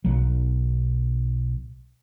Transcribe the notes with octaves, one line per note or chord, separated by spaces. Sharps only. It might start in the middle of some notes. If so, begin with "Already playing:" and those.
B1 F#3